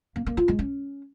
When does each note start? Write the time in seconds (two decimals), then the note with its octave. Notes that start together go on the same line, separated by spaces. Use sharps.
0.16 A#3
0.26 A#3
0.37 F4
0.48 G#3
0.59 C#4